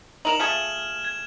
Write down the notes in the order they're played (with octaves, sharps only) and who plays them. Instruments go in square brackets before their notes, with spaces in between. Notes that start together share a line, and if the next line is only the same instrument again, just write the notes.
[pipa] D#4 A#4 [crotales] E7 F#7
[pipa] F3 A3 G#4 [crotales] F6 G#6 E7
[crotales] G#6